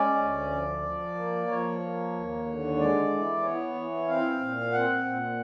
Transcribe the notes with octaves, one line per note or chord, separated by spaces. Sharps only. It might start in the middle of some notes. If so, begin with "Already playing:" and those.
Already playing: G#3 C#4 D5
D2
F3
F3
A#3
F3 C#5
A#3
D#2
D3
G#3 D5
E3
B3 C#5
E3
C4 F5
A#2
C4 F#5
A#2